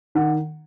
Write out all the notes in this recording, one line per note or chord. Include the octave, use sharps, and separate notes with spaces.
D#3 F#5